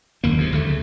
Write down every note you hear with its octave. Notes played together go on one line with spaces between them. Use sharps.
F#1 D#2 A#3
E2 C3
D2 D3 A3
C#3